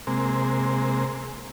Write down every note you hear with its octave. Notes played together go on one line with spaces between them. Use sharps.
C3 G#3 A#3 C4